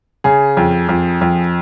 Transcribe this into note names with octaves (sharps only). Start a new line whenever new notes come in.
C#3 G#4
F2
F2
F2